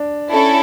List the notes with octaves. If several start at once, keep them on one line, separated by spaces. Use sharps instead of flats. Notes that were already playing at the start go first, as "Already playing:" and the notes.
Already playing: D4
C#4 E4 A4